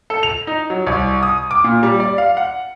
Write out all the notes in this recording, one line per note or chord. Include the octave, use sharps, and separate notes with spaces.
A4
F7
D#4
F#3
C2
D#6
D6
A#2
G3
D5
F5
F#5